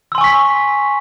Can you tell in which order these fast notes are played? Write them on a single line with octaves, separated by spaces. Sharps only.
E6 C6 G#5 C#6 B6